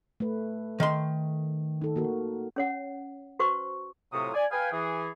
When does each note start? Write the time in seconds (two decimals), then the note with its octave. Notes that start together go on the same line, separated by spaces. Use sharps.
0.20 A3 B4
0.80 D#3 C6
1.82 D#4 A4
1.96 A#3 F#4 A#4
2.56 C#4 C#5 F#5
3.39 F#4 B4 C5 C#6
4.13 A2 C3 F#3 F4 C#6 D#6
4.35 D5 G#5
4.51 B4 F5 G5 G#5
4.72 E3 G#4